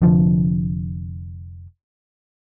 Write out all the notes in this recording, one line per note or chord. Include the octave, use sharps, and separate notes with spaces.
F1 F2 D3 F3